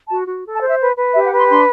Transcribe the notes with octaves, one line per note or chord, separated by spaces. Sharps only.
F#4 A5
F#4
A4
A5
C5
E5
B4
B4
G4 E5
F#5
B4
C6
D4 C6